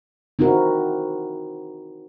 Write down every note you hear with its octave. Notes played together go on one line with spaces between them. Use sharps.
C4 D#4 E4 F#4 A#4